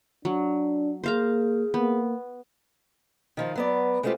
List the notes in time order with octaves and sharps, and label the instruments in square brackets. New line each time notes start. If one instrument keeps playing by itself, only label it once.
[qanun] F#3 [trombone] D4
[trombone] A#3 [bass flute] G#4 [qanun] C5 F5 A#5
[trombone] A#3 [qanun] B3
[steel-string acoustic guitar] D#3 F3 F4
F#3 B3 D5
G#3 A3 C4 E4 F4 G4